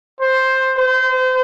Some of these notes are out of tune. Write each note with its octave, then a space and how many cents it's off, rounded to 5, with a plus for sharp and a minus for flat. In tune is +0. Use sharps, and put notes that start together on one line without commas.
C5 +5
C5 -30